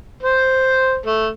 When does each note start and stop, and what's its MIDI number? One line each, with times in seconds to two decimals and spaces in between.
0.23 0.99 72
1.06 1.30 57